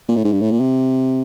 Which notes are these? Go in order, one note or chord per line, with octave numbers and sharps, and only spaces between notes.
A#2
A2
G#2
G2
A2
A#2
C3